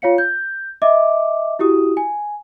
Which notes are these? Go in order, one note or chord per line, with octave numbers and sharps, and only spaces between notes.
F4 C#5 F5 C#7
G6
D#5 E5 D6
E4 F#4 G4 D#6
G#5